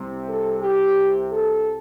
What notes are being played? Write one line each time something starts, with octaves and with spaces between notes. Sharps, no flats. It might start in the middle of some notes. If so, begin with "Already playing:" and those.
Already playing: C2 C3 G3
A4
G4
A4